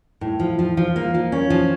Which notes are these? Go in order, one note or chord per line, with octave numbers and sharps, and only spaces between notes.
A2
F3
F3
F3
A#3
F3
C#4
F3